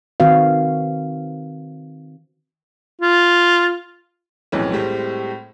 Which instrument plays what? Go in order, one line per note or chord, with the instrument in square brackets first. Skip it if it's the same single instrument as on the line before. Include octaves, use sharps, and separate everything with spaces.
[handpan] D#3 C4 F#4 B4 F5
[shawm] F4
[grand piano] B1 F2 A2 E3 G#3 C#4
A2 G3 G#3 C4